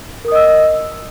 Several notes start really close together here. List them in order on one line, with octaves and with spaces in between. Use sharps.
A#4 D#6 D#5 E6